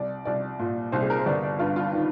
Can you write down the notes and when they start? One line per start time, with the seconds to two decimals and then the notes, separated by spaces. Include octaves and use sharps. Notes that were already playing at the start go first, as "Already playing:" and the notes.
Already playing: C2 D5
0.25 C2 D5
0.59 A#2
0.92 C2 C5
1.02 G#4
1.10 A#4
1.19 C5
1.26 G1 D5
1.43 D5
1.59 G2 F4
1.76 F4
1.93 D#3